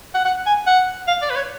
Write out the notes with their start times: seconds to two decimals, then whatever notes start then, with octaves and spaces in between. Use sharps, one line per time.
0.15 F#5
0.25 F#5
0.46 G#5
0.66 F#5
1.08 F5
1.22 D5
1.30 B4
1.36 C#5